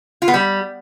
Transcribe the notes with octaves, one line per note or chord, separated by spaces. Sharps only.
F4
B3
G3